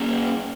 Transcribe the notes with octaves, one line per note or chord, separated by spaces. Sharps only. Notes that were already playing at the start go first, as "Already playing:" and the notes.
Already playing: A#3 C#4 G#4